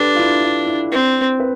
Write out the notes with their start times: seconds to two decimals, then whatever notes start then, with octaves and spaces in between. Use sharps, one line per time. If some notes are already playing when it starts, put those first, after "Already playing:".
Already playing: D4 G4 A4 B4
0.15 F4
0.19 E4
0.43 F4
0.67 E4
0.91 C4
1.40 B4